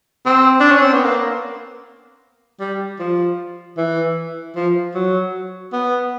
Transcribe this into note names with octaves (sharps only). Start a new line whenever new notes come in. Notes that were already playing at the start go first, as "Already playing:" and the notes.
C4
D4
C#4
C4
B3
A#3
G3
F3
E3
F3
F#3
B3